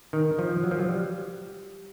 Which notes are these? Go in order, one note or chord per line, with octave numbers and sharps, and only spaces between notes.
D#3
F3
F#3
F3
F#3
G3